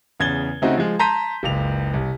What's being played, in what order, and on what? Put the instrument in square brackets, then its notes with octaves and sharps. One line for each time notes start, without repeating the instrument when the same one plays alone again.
[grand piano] E2 C#3 G#6 A6 G7
C#3 A3 C4 D#4 F#4
F3 G#3
A5 A#5 C6 G6 B6 D#7
F#1 C#2 F7
C2